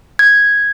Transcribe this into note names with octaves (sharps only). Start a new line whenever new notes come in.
G#6